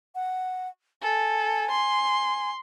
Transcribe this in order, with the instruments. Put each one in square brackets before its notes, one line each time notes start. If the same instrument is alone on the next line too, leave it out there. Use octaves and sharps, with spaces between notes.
[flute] F#5
[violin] A4 [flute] G#5
[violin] C6